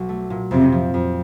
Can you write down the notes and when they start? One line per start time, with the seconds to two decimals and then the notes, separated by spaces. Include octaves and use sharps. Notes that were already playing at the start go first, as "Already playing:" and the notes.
Already playing: B1 F#3
0.09 A3
0.30 A#2
0.51 F2 C3
0.72 F3
0.94 F2